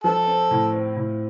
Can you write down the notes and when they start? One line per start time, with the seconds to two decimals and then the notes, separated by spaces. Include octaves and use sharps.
0.04 F3 A4
0.27 C4
0.51 A2
0.73 C4
0.96 A2